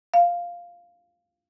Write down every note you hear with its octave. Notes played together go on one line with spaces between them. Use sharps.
F5